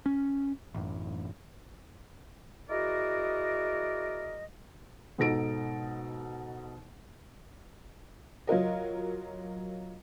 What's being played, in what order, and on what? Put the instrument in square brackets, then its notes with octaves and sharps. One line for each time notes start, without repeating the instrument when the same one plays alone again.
[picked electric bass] C#4
A1 F#2
[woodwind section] E4 F#4 G#4 A#4 D5 D#5
[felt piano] G#2 B2 D#4 A4 A#6 D7
[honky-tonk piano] F#3 F4 A#4 D#5